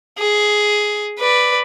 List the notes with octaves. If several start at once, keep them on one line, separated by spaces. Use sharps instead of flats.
G#4
B4 D5